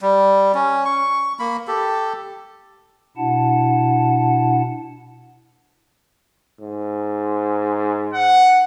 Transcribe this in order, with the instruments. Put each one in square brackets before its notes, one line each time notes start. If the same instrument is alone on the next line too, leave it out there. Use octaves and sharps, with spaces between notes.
[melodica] G3
C#4
C#6
A#3 B5
G4 A4
[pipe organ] B2 D4 E4 F#5 A5
[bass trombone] G#2
[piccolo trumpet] F#5